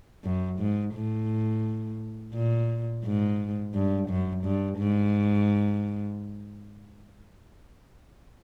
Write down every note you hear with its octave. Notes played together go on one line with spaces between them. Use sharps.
F#2
G#2
A2
A#2
G#2
G2
F#2
G2
G#2